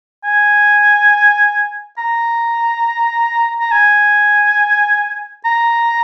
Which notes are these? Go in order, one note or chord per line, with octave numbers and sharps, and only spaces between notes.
G#5
A#5
A#5
G#5
A#5